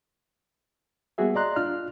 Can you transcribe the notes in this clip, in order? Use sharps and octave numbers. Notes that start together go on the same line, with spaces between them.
G3 A#3 B3 F#4 G#4 E5
D5 D#5 A#5 C6 F#6
D4 F4 F6